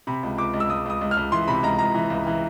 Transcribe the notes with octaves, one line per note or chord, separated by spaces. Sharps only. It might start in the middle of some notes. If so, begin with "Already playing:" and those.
C3 B5
C#2
C#2 D6
C#2
E6
C#2 D#6
C#2 D#6
C#2
F6
C#2
E3 C6
C3 B5
C#2 A#5
C#2 A#5
E3
C#2
E3